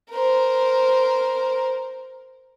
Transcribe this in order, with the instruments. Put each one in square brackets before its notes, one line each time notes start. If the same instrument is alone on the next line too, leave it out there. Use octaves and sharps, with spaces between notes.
[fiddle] A#4 C5